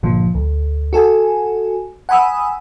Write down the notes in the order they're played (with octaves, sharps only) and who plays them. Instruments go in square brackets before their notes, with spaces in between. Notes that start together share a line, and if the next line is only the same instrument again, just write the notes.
[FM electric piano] G1 A#2 D3 F3
D2
F#4 A4 G#5
F#5 G#5 B5 D#6 E6